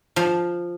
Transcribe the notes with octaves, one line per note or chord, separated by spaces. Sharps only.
F3